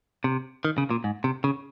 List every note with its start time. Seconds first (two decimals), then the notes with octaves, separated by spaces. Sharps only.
0.24 C3
0.65 D#3
0.78 C#3
0.90 A#2
1.04 G#2
1.24 C3
1.44 C#3